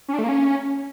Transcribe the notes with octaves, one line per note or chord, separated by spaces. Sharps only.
C#4
D4
A3
A#3
C#4